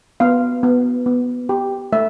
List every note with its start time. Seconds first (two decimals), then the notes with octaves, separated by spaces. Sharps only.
0.20 B3 F5
0.63 B3
1.06 B3
1.49 G4
1.92 A3 E5